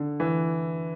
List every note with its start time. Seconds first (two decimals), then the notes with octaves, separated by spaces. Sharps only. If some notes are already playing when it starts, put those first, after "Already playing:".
Already playing: D3
0.20 E3